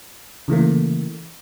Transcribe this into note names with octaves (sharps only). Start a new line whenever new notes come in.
C#3 E3 A3 A#3